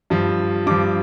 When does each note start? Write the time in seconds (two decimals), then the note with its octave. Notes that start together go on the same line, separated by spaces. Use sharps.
0.10 G2 F3
0.67 G2 F3 D6